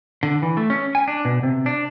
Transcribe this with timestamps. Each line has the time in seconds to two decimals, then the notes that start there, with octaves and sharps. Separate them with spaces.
0.23 D3
0.42 E3
0.57 A3
0.70 C#4
0.95 G#5
1.08 D4
1.25 B2
1.43 C3
1.66 D4